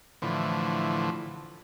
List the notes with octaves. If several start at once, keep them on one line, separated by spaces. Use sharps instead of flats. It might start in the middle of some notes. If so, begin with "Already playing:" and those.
A2 D3 E3 F3